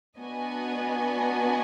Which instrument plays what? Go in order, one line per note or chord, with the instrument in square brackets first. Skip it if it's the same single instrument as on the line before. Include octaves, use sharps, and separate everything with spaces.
[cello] B3 [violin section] D4 F#4 B4 D#5 G#5